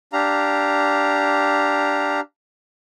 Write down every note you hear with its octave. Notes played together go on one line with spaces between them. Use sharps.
D4 G4 F5 A#5